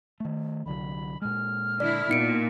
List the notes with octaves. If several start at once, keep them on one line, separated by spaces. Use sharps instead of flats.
D#3 A3
C2 D3 F#3 B5
A#2 G#3 F6
D3 E4 D5
A#2 B3 D#4 C#7 D7